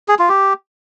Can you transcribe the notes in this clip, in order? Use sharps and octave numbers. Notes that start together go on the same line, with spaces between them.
G#4
F4
G4